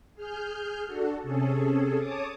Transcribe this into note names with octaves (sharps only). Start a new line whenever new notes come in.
G#4 F6 G6
D4 F#4 A4
C3 C#4 G#4 A4
C#5 A5 D6 D#6